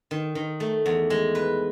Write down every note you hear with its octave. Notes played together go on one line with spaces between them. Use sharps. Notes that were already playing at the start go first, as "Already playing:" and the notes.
D#3
D#3
A3
E2
G#3
B4